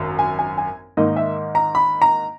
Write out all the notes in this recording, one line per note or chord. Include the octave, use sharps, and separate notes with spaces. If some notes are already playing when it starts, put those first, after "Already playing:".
Already playing: G#1 F#2
G#5
G#5
G#5
G#2 D#3 A#3 D#4 D#5
E5
A#5
B5
A#5